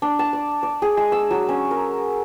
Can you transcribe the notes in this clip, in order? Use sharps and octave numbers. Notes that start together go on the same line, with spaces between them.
D4
A5
D5
D5
G#4
G#3
E6
F#3
C#4
A#4